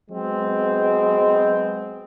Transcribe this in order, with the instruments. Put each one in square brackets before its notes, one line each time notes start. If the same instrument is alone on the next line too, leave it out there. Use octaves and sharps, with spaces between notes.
[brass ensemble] F#3 G#3 B3 C4